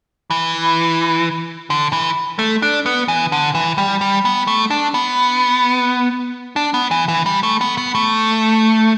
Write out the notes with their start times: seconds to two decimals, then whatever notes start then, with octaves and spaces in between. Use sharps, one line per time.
0.31 E3
1.70 D3
1.93 E3
2.39 A3
2.62 D4
2.86 B3
3.08 E3
3.32 D3
3.55 E3
3.78 G3
4.01 G3
4.25 B3
4.47 A3
4.70 D4
4.94 B3
6.56 D4
6.74 B3
6.91 E3
7.08 E3
7.26 G3
7.43 A3
7.61 B3
7.78 B3
7.95 A3